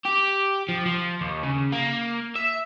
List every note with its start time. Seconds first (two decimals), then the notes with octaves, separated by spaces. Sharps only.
0.05 G4
0.69 F3
0.86 F3
1.21 D#2
1.43 C#3
1.72 A#3
2.36 E5